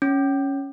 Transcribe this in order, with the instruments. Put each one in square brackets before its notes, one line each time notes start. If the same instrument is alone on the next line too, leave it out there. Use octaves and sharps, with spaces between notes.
[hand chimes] C#4